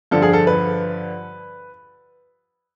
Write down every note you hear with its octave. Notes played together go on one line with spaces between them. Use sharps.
G2 D3 F3 A4
G#4
A4
B4